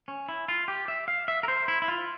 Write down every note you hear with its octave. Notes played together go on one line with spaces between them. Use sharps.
C#4
E4
F4
G4
E5
F5
E5
A#4
C5
E4
E4
F4